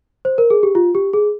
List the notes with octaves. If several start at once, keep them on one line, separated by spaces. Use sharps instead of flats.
C5
A#4
G#4
G4
F4
G4
G#4